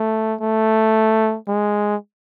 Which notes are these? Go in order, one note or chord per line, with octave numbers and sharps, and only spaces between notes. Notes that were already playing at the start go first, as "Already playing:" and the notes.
Already playing: A3
A3
G#3